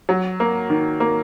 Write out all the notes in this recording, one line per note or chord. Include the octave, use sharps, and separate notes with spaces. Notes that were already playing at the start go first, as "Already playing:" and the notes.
F#3
A#3
D#3
A#3